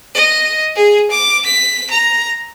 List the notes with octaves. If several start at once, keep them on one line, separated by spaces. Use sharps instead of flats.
D#5
G#4
D6
B6
A#5